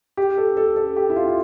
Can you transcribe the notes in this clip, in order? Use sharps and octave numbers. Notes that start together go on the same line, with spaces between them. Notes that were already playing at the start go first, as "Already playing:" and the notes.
G4
A4
A4
A4
G4
E4
F4
F4